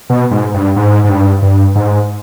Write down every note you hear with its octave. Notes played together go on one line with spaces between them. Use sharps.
B2
G#2
G2
G#2
G#2
G2
G2
G#2